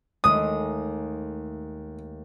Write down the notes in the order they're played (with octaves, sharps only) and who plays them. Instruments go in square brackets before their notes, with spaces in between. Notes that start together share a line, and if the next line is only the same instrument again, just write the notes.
[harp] D#2 G#3 A3 [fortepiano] D#6